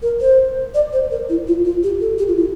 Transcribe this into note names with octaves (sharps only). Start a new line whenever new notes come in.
A#4
C5
D5
C5
A#4
E4
F4
F4
G4
A4
G4
F4
E4